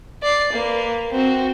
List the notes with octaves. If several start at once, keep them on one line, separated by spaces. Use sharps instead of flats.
D5 C7
A#3 B4
C4 F#4